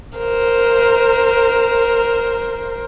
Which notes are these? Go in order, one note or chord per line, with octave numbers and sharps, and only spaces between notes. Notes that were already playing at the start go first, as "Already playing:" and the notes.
A#4 C5